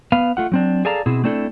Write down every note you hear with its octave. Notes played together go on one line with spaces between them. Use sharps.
B3 B4 F5
A3 F4 F#5
F#3 C4 D4
G#4 A4 D5 F5 A5 A#5
B2 C4 E4 G#4
A3 C4 D4 E4 A4